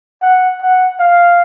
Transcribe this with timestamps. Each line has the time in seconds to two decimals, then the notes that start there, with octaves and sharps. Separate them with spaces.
0.22 F#5
0.61 F#5
1.00 F5